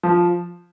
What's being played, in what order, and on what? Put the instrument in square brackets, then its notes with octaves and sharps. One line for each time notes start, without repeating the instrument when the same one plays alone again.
[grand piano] F3